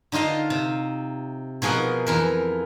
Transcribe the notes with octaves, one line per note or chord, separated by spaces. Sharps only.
D3 D#4 F4 D#5 F5
C3
B2 F3 G#4 A#4 F#5
F2 E3 A#4